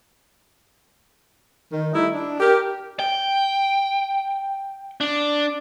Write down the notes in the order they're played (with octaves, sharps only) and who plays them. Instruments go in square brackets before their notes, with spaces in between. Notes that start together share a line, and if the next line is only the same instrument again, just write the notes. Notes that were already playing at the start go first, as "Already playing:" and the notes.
[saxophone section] D#3
G3 A3 D#4 E4
D4
G4 A#4
[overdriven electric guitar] G5
D4